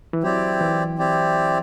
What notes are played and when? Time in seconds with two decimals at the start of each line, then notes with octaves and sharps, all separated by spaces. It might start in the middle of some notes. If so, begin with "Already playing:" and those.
0.13 E3
0.23 F#3 C4 E4 G4 D5
0.61 E3
0.98 C4 E4 G4 D5